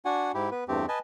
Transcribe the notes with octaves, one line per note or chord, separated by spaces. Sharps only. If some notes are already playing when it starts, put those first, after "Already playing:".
D4 F#4 F#5 G#5
G#2 E4 G4
B3 B4
E2 G2 A3 C4 G4
B4 D#5 G#5 A5